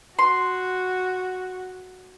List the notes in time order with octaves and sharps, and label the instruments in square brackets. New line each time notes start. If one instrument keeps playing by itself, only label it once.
[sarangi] F#4 [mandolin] C6